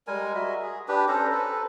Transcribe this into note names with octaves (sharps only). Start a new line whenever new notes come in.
G3 G#3 A#4 G#5
F#4 D#5 E5
G#4
D4 G4 B4
C#4 A4 C5 A#5
A4 B4